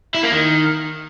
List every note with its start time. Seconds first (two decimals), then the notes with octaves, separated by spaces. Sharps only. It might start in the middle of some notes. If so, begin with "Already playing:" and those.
0.15 E4
0.23 A#3
0.32 D#3